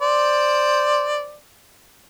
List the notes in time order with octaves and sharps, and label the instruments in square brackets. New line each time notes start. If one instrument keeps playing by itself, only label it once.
[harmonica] C5 D5